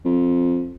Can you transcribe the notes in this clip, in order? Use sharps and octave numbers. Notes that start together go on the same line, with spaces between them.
F2